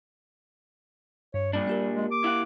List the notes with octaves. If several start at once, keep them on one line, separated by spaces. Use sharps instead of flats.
G2 C#5
A#2 G3 D4
A#3 G4 A#4
G#3
D6
E4 F5 F#5